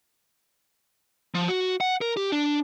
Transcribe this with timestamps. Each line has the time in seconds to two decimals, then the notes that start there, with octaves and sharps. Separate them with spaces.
1.35 F3
1.48 F#4
1.81 F#5
2.01 A#4
2.17 G4
2.32 D4